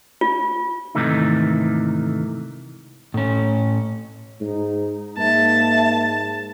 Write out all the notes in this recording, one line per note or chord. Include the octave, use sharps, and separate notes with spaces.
F4
G#2 C3 D#3 E3 A3 D#4
A2 C#4
G#2 D#4
G#2 A#3 E5 A5